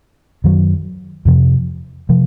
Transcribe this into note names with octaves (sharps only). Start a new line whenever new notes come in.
F#2 D#3 F#3
F2 C3 F3
C3 F3